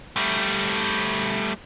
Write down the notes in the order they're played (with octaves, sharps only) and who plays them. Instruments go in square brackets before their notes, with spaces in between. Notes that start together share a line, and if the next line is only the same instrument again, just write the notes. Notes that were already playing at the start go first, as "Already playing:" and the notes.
[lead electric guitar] G3 A3